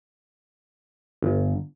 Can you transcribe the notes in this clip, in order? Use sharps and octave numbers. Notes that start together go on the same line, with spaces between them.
G1